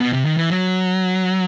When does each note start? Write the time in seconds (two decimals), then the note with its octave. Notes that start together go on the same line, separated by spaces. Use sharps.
0.00 B2
0.13 C3
0.25 D#3
0.37 E3
0.50 F#3